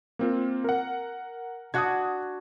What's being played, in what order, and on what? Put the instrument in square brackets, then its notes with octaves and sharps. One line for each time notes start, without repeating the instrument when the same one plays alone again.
[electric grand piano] A#3 C4 F4
A#4 F#5
[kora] D4 F#4 [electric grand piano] D#6 F#6 G#6